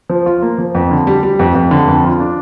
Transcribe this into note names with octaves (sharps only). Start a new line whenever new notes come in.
F3
F4
A#3
F3
F2
D3
G3
G3
F2
F2
D3
F2
F4
D4